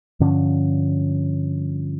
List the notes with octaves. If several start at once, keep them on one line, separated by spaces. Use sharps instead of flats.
G2 D3 F3 C#4